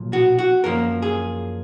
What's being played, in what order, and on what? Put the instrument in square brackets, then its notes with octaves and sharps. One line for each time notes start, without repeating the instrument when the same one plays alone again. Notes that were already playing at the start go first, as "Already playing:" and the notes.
Already playing: [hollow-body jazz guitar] B1 A#2 F3
F#4
F#4
F#2 F3 A#3 A#4
G#4